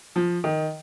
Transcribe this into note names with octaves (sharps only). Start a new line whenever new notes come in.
F3
D#3